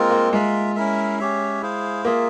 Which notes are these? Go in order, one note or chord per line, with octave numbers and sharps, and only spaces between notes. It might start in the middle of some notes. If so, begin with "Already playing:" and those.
Already playing: G#3 A#3 C4 F4 A#4
A#3
G#3 F4 A#4 E5
C#4 E4 A#4 E5
C#4 G4 C#5 E5
E4 G#4 C5 F5
A#3 F4 G#4 E5